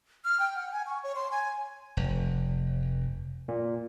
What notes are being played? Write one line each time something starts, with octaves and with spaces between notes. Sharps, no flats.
F6
G5
F#5
G#5
C#6
C#5
C6
G#5
F1
A#2